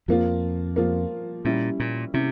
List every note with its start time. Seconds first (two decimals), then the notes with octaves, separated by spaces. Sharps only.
0.08 F2 F3 A#3 F4
0.76 F3 A#3 F4
1.45 A#2 G3 C#4 E4
1.80 A#2
2.14 C3 C#4 E4